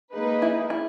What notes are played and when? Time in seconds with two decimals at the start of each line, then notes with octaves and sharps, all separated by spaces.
0.13 A#3 D#4 G#4 B4
0.42 E4
0.70 E4